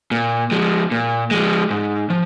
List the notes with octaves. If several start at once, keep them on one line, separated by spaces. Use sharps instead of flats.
A#2
F3 G#3
A#2
F3 G#3
G#2
F3